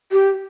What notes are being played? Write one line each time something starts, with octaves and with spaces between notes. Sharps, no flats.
G4